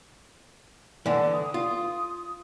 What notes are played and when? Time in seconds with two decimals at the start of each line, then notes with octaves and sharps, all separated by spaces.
1.06 D3 E3 F#5
1.33 D#6
1.54 F4